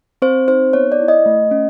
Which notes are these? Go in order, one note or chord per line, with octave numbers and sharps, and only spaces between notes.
C4 C5
D#4 C5
B3 C#5
D5
E4
D#5
A3
C#4